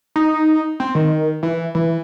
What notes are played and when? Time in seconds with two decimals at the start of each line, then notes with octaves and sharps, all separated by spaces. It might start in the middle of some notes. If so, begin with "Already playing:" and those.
0.16 D#4
0.80 C4
0.95 D#3
1.43 E3
1.75 E3